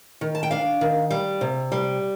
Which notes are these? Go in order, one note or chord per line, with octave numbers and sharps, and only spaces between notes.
D#3
A5
G5
D4 F5
D#3
G3
C3
G3